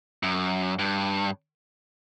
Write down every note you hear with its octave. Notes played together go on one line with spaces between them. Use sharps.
F#2
G2